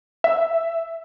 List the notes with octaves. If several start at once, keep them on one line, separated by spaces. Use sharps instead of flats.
E5